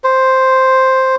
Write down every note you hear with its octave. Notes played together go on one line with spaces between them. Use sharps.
C5